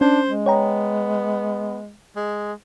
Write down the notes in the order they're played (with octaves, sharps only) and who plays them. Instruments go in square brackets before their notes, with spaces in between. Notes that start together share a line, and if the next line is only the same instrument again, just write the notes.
[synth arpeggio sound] C#4 [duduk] D4 [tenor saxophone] C5
[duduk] G#3
[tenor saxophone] B3 [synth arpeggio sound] C#5 G5 A#5
[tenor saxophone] G#3